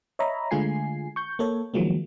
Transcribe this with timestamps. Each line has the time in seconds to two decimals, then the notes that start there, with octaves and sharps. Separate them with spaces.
0.19 C#5 D#5 E5 A#5 B5
0.51 D3 G#3 A3 F4 G#5 C7
1.16 C#6 G6
1.39 A#3 A4 C#5
1.74 D#3 F3 F#3 G#3 A#3